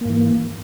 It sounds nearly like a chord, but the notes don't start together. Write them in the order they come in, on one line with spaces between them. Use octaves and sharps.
A#3 G#2 E3